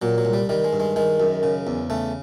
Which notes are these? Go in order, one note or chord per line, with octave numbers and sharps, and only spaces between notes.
A#2 F#3
F#3
C2
G3
D#3 G3
G#3
G2
G#3
D#3 G#3
F#2
C#3
E2
C#3 A3